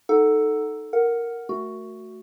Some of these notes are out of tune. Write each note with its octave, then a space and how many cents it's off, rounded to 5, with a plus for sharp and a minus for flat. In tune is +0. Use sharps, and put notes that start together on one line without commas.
D#4 +0 A4 +0 F#5 +0
A#4 +0 F#5 +0
A3 +0 F#4 +5